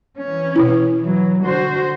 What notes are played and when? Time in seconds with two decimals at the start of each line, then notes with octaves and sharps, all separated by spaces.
0.18 E3 C#4
0.56 B2 E4
1.01 E3 F#3
1.47 D3 F#4 C5